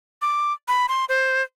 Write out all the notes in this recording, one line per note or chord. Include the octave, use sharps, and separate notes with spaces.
D6
B5
C6
C5